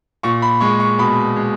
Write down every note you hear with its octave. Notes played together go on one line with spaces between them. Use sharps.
A#2 C#6
B5
G#3 C#6
C#6
B2 B5
G#3